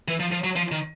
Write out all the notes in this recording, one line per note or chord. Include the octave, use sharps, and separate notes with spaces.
E3
F3
F3
F#3
F3
D#3